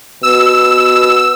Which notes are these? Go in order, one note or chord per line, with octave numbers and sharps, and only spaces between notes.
B2 E6